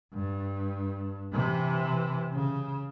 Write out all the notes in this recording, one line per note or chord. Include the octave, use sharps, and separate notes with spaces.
G2
C3 E3
C#3